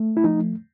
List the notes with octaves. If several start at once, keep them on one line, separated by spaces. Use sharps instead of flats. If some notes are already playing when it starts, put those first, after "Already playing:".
Already playing: A3
E4
F3 D#4